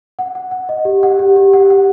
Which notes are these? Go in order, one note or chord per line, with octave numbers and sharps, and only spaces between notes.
F#5
F#5
F#5
D#5
G4
F#5
G4
G4
F#5
F#5